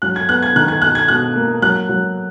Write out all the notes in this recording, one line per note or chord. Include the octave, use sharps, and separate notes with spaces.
F#3 F#6
G#6
B3 F#6
G#6
D#3 F#6
G#6
B2 F#6
G#6
B2 F#6
A#3
F#3 F#6
F#3